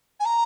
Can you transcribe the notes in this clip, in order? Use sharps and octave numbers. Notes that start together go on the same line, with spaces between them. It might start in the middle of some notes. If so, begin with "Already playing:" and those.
G#5
A#5